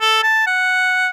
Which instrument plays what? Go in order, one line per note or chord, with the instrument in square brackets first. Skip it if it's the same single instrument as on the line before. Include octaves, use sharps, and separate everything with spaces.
[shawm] A4
A5
F#5